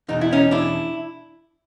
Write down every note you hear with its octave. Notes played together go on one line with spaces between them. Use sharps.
E2 B2 D#4
E4
C#4 D#4
D4 E4